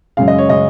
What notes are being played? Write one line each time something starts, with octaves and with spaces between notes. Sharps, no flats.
F#2 C#3 G#3 F5
D#5
C#5
C#3 G#3 D#5